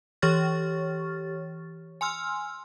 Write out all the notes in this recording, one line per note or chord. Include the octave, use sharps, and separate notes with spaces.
E3 G4 C#5 C#6 F6 A6
G#5 C6 E6 F6